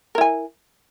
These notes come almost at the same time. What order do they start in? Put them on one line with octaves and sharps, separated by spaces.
A#4 E4 G#5